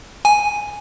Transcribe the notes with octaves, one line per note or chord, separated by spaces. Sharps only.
G#5